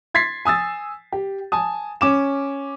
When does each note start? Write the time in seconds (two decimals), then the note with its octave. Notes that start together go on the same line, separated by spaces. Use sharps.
0.14 C6 G#6 A6 B6 C7
0.45 G#5 D#6 E6 A6
1.13 G4
1.52 G#5 A5 D#6
2.01 C#4 D6 E7